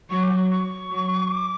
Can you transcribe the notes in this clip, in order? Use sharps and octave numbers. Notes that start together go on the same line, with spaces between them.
F#3 C#6
D6
C#6
C#6
F#3
D6